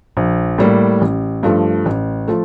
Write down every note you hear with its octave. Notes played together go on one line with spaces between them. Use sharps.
A#1
A2 G3 A#3
A1
G2 F3 A3
A1
F3 A3